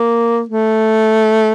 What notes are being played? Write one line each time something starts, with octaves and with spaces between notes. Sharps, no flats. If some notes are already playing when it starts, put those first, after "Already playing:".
Already playing: A#3
A3